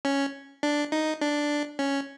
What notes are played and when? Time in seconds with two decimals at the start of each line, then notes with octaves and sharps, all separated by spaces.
0.05 C#4
0.63 D4
0.92 D#4
1.21 D4
1.79 C#4